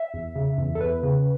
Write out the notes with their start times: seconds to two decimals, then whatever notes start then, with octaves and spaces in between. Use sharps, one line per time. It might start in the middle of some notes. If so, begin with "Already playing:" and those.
Already playing: E5
0.14 E2
0.36 C#3
0.58 E2
0.75 A4
0.80 E2 B4
1.03 C#3